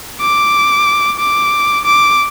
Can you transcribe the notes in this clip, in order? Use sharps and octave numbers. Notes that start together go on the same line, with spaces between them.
D6
D6
D6